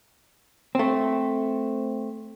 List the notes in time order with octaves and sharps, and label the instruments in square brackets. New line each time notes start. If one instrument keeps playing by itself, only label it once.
[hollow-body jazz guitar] A3 C4